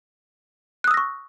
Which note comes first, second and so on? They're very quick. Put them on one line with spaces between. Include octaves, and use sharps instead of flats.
F#6 D#6 E6 A#6 C#6